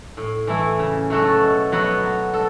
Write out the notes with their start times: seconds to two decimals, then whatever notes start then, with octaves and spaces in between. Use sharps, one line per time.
0.17 A2
0.47 E3 A3 E4
0.79 C#3
1.10 F#3 A3 F#4 A4
1.41 B2
1.72 F#3 B3 F#4 A4
2.03 F#3
2.34 A4